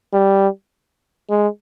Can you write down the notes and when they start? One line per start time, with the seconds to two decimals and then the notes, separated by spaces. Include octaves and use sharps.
0.13 G3
1.30 G#3